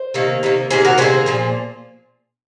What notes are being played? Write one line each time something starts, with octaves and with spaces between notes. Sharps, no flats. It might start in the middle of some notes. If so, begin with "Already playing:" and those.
Already playing: C5
C3 D#3 A#3
C3 D#3 A#3
C3 D#3 A#3 G#4 C5
F#4 A#4
C3 D#3 A#3 G#4 C5
A#2 F3 A#3